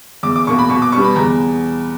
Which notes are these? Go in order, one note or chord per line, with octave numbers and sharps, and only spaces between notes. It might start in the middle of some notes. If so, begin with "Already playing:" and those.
E2 D6
D6
B2 A#3 C#6
B5
B2 C#6
D6
G3 B3 C#6
B5
E2 A#5